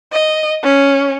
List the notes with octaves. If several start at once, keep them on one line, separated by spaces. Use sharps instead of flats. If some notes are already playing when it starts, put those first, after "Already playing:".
D#5
C#4